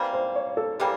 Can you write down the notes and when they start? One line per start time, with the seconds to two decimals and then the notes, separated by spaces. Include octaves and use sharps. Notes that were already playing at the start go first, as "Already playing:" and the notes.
Already playing: C3 E3 G3 A#3 C5
0.13 C5
0.36 C#5
0.57 A4
0.79 C3 E3 G3 A#3 G4